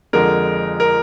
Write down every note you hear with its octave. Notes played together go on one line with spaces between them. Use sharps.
F2 D3 G#3 D4 A#4
A#4